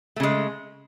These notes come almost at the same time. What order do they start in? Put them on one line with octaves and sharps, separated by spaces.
A3 C#3 G#3